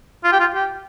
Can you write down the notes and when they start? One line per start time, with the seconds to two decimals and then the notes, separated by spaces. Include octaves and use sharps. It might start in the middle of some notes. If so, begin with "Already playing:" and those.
0.24 F4
0.32 G4
0.40 F4
0.55 G4